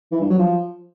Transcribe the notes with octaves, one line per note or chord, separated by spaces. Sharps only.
E3
G2
F#3
F3